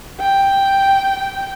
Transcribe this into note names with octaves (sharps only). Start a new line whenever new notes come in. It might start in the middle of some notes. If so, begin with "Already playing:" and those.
G5